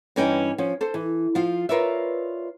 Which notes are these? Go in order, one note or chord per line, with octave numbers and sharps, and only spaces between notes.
G2 E3 C#4 D#4 G5 G#5
F3 C#4
A4 C5
E3
F3 F4
F4 A#4 B4 C#5 D5 E5